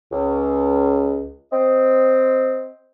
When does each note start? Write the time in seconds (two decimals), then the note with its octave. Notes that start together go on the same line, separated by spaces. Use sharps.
0.12 C#2
1.52 C4 D#5